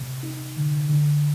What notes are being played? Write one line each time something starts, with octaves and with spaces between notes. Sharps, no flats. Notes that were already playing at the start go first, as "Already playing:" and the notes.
Already playing: C3
D#4
D3
D3